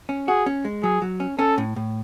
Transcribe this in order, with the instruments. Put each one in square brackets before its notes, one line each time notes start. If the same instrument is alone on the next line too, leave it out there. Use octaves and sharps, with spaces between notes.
[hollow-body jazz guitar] C#4
[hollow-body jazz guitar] F#4 [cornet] G#4
[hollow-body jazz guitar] C#4
G#3
[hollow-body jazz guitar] F#3 [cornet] G#4
[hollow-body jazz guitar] F#3
C#4
[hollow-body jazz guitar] C#4 [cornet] A4
[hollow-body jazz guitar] A2
A2